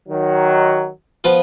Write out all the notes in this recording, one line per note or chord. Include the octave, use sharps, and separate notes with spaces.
D#3 F#3
F3 B3 F4